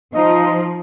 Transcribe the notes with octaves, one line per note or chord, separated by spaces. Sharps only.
F3 D#4 D#5